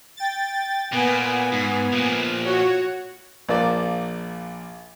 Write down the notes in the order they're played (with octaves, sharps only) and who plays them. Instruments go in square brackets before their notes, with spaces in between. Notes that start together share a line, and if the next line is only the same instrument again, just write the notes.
[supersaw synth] G5 A6
[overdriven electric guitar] A#2 [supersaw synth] B3 G#5
[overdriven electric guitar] G#2
A#2 F3
[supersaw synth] F#4 C#5
[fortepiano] A#1 F3 A#3 D5